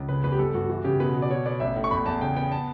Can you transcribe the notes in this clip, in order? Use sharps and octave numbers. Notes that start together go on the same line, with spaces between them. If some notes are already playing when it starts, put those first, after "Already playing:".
Already playing: C#2
C#3 B4
E2 B4
G4
G1 A4
G2 F#4
E3 F#4
C#3 G4
B2 B4
B2
D5
B2 C#5
B3 D5
A1 E5
A2
C#6
E2 B5
E2 A5
C#3 G5
B3 G5
A5